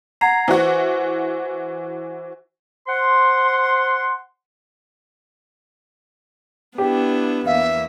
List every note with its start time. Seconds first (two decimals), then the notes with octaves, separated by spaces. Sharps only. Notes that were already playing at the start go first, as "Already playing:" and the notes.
0.21 F#5 A#5 G#6 C7
0.48 E3 F#4 C5
2.87 C5 F#5 C6
6.78 B3 D4 E4 G4
7.46 E2 A#3 E5 F5